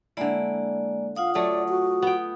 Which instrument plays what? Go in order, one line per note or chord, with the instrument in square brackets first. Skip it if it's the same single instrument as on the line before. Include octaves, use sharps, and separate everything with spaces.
[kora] D3 E4 [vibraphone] G#3 A#3 D5
[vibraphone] F4 F#5 D#6 [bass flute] F5
[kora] F#3 A3 [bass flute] D5
[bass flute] F#4
[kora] B3 G5